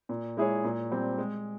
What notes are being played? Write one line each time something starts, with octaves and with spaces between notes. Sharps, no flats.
A#2
G#3 E4 G#4 C#5
A#2
G3 C4
G#3